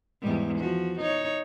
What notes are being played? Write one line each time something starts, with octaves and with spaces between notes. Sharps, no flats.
E2 G#2 G3
F3 F#4
D#4 C#5